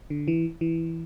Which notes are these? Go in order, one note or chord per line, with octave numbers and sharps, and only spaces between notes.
D3
E3
E3